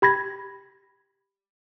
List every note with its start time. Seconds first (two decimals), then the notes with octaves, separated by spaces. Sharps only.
0.02 G4 B5 G#6 A#6